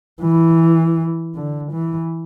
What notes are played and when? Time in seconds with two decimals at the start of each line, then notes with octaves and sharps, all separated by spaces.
0.22 E3
1.35 D3
1.72 E3